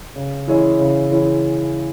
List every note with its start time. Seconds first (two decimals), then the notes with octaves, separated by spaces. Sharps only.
0.16 C#3
0.47 E3 G#3 C#4 E4
0.79 C#3
1.11 E3 G#3 C#4 E4